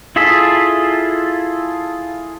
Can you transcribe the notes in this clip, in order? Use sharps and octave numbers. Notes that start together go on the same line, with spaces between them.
E4 F4 G#4 A4 E5